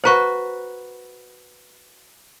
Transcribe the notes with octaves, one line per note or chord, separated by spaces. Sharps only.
F#4 B4 C5 F#5 A#5 C#6